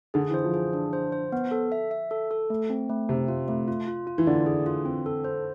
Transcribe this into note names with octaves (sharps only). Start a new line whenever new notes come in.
D3 G#4
E3
C5
F3
G#4
D4
C5
C5
B3
A4
E5
E5
A4
A4
A3
C4
A3
C3 C4
F4
A3
F4
F4
F4
E3
D3 D5
G#4
F4
C4
A4
C5